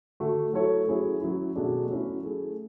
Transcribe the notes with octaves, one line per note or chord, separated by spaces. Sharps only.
D3 A3 D4 F#4
F#3 A3 E4 A4 C#5
F#3 C#4 E4 G#4 C#5
F#3 C#4 E4
B2 F#3 A3 D4 G#4
F#3 C#4 E4
A3 E4 G#4